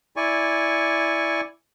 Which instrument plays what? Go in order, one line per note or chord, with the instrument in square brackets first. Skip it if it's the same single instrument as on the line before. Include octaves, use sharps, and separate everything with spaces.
[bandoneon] E4 D5 G#5 C#6